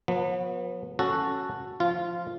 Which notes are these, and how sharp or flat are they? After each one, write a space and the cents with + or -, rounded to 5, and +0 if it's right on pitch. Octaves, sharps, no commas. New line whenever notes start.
F#3 -45 B3 -15
C#4 +0 F#4 +0 A4 +5
F3 +0 F4 -15